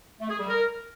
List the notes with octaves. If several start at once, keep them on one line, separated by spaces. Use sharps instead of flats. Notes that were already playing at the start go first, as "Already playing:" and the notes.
A3
G#4
G3
A#4